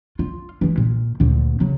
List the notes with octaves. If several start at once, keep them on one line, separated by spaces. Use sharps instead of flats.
F4
E3 G#3
A#2
D2 A#2
C#3 F#3